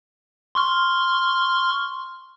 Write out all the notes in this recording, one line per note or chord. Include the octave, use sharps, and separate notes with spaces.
C6 C#6 F6